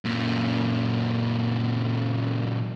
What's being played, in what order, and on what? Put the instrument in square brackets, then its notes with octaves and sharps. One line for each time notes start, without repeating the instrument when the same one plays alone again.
[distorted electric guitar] F#2 A#2